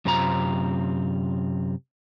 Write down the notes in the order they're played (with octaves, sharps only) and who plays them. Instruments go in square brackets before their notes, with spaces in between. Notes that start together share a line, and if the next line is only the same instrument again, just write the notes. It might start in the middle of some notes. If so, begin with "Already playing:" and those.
[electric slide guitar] F#2 C3 C4 F4 A5 A#5